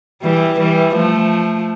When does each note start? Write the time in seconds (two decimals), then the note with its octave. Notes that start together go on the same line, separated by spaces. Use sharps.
0.22 E3 G3
0.59 E3 G3
0.95 F3 A3